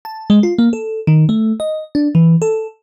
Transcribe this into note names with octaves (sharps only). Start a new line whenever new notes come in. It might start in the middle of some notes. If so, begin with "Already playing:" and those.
A5
G#3
F4
A#3
A4
D#3
A3
D#5
D4
E3
A4